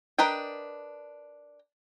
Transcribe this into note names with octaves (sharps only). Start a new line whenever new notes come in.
D4 A#4 B4 D#5 G5